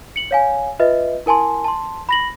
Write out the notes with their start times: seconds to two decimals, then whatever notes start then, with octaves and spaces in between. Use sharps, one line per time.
0.16 C#7 F#7
0.31 C#5 F5 G#5
0.79 F4 B4 D#5 E5
1.26 E4 A#4 G#5 A5 C6
1.64 A5 C6
2.09 B5 A#6 F#7